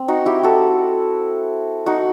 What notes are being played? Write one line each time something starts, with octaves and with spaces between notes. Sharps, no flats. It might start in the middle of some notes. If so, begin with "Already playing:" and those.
Already playing: C4
D#4 F#4
E4 G4
F#4 A4
D#4 F#4